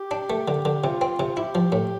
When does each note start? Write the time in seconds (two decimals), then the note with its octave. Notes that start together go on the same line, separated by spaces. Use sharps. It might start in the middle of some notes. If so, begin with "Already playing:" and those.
Already playing: G4
0.11 D4
0.30 A3
0.48 D3
0.65 D3
0.83 C3 F4
1.01 C4
1.20 C3
1.37 E4 G4
1.55 F3
1.72 A2